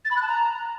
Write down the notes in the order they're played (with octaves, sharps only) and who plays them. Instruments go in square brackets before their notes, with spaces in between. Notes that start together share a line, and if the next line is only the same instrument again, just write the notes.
[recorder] A6
B5
F#6
A5
A#5